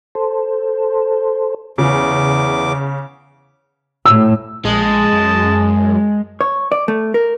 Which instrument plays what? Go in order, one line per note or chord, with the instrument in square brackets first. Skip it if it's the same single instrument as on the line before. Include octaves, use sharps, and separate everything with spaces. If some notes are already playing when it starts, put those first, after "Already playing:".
[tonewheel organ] A4 C5
[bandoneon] E2 D6 [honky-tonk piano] C#3
[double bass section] A2 [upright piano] E6
[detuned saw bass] A#1 [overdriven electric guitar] G#3 [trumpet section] D#5 A5
[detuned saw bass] F#2
[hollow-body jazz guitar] C#5
D5
A3
A#4